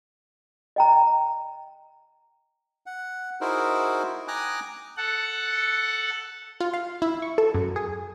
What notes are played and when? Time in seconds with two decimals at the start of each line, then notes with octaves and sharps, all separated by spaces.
0.76 D#5 G5 A#5
2.86 F#5
3.41 D#4 E4 F#4 G#4 A#4 C5
4.28 G5 G#5 A#5 D6 D#6 F#6
4.97 A4 F#5
6.60 F4
6.74 F5
7.02 E4
7.22 C#6
7.38 A4
7.55 F#2
7.76 G#4